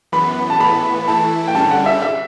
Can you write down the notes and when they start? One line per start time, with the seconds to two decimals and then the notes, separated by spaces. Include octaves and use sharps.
0.12 F#2 E3 B3 B5
0.50 A5
0.60 A2 E3 B3 B5
1.07 E3 A3 E4 A5
1.48 G5
1.54 G2 D3 G3 C#4 A5
1.71 F#5
1.86 E5
2.02 E5